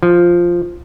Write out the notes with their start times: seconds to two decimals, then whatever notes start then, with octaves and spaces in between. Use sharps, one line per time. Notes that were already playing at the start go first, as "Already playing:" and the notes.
0.03 F3